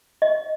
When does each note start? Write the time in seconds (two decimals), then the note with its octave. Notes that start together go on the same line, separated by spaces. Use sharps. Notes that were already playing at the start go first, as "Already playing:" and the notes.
0.22 D#5